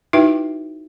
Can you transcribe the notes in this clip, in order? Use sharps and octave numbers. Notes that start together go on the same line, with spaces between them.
D#4 E4 F#4 B4 E5 G5